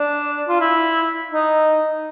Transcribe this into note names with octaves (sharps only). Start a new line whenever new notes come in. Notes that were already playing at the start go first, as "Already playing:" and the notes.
Already playing: D4
F4
E4
D#4